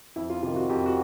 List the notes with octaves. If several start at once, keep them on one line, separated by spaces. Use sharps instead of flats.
F2 E4
F4
C3 D#3 F4
F#4
F2 G4
F#4